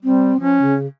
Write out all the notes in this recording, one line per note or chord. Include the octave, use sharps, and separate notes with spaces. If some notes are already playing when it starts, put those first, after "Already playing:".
G3 C4
F3 C#4
C#3